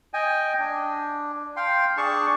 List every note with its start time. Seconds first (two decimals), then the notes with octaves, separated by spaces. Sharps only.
0.14 D#5 G5 G#5
0.60 D4
1.56 F5 G5 C6
1.97 D4 G#4 A5 C#6